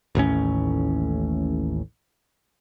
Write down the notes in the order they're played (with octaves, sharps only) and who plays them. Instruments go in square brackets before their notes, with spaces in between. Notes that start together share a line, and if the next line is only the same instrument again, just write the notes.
[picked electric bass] A1 D#2 A2 C#4